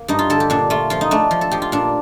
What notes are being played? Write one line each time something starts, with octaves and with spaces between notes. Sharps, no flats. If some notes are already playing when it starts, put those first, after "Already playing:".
Already playing: A#3
G2 D#4
F4
D3 A4
G4
A#2 D4
A3 F4
F3 F4
D#4
A3 D4
F3
A4
F3 G4
F4
A#2 D4